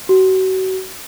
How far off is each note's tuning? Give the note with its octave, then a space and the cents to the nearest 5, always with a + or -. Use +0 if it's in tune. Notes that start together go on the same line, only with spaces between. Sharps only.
F#4 +30